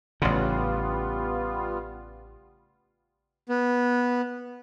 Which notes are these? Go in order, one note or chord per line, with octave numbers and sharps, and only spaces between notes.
A1 C#3 G3 B3 F4
B3